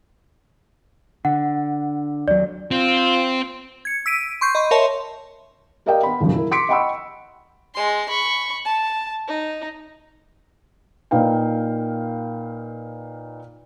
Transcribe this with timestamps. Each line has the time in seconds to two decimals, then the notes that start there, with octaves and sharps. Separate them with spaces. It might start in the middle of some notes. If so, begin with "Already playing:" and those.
1.25 D3 F#5
2.28 D#2 F#3 D5
2.71 C4 F4
3.85 G#6 C#7
4.06 E6 B6 D7 D#7
4.41 C6 C#6 G6 C7
4.55 D#5 B5 C#6
4.71 A#4 C#5 D#5 E5 A5 C6
5.86 G4 A#4 D5 D#5 F5 G5
6.03 B3 B5
6.20 D#1 C#2 F#2
6.32 E4 A#4
6.51 C6 D6 B6 C#7 D7
6.69 D#5 F#5 G5 B5 C#6 E6
7.74 G#3 C6
8.09 B5 C#6
8.65 A5
9.28 D#4
11.11 A#2 D#4 B4 F5 G5